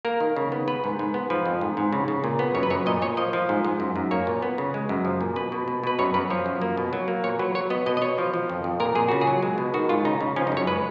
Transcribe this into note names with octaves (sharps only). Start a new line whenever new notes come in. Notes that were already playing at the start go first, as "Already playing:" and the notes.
A#3 A#4
D#3
C#3
B3
B3 B4
G#2
G#2
B3
F3 B4
F2
G#2
G#2
C#3
C#3
A#2
B3
F#2 C#5
B4
F#2 C#5
A#2 D#5
A#2 C#5
F3 D#5
F3
G#2
G#2
F#2
F#2
A#3 C#5
A#2
B3
C#3
G#3
F#2
F3
A#2
B2 B4
B2
B2
B2 B4
F#2 C#5
F#2 B4
F3 C#5
F#2
A#3
B2
F#3
A#3
A#2 C#5
F#3 B4
F#3 C#5
B3 D#5
B2 D#5
D#5
B2 C#5
F3
F3
F2
F2
A#2 A#4
A#2 G#4
C#3 F#4
G#4
F#3
G#3
B2
D#3 F#4
G#2 F4
C#3 D#4
C#3
F3 C#4
D#4
F#2
C#5
G#3 B4